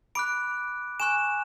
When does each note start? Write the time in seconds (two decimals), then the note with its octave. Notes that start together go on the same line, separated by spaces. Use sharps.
0.15 B5 D6 F#6 D7
1.00 G#5 C#6 F#6 E7